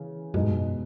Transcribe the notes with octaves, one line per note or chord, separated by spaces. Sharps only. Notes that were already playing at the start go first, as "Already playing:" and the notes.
Already playing: C#3 E3
F#2 B2 G#3 D#4
G#2
F#2